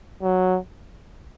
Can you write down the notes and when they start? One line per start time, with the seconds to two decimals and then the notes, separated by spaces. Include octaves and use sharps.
0.23 F#3